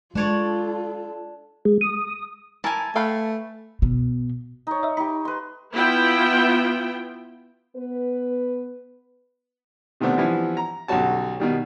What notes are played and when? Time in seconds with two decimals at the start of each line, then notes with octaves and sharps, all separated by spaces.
0.15 G#3 D4 F4 A4 C#5 D5
1.65 G#3
1.81 D#6
2.64 E3 E4 A#4 G#5 A5
2.96 A3 B4 F5 G5
3.82 B2
4.67 D#4 C#5
4.83 D#5 E5
4.97 D#4 G4 B5
5.25 B4 C6
5.72 B3 E4 F4 G5
7.75 B3 B4
10.00 C3 D#3 A3 B3 C4 D4
10.18 E3 F3 G3 B3 E4
10.57 A#5
10.88 B1 D3 G3 C#4 F#4 A5
11.40 B2 D#3 G3